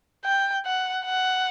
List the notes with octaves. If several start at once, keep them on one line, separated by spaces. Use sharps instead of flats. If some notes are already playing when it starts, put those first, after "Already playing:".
G5
F#5
F#5